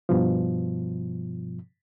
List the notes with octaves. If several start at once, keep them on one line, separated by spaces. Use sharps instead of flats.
G2 B2 F3